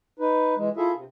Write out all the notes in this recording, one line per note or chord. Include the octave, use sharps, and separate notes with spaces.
D#4 B4
E3 G#3
E4 F4 G#4 A4 E5
C3